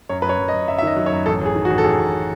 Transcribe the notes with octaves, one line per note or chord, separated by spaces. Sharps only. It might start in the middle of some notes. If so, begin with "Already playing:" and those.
F#2 C#5
F#2 B4
C#5
F#2
D#5
F#2
F#2 E5
E5
D#3 D#5
F#3
C#5
F#2
A1 A4
A1 G#4
D#3
F#4
A1
A4
A1 G#4
A1